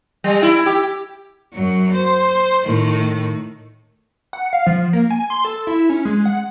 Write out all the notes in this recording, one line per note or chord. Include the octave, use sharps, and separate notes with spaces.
G3
E4
G4
F#2 F#3
C5
A2 D#3
F#5
F5
F3
A#3
G#5
C6
A4
E4
C#4
G#3
F#5